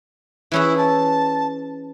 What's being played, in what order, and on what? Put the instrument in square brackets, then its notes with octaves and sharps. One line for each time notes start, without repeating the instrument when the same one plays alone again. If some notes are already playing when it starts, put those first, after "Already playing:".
[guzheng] E3 C#4 G#4 [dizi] E4
[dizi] A5